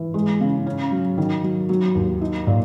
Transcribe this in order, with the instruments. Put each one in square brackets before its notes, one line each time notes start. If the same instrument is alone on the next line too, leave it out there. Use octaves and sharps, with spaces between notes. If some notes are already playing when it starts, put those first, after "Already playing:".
Already playing: [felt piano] E3
G#3
C#3
C#4
F#3
D#3
F#3
F#3
D#2
D#4
A#2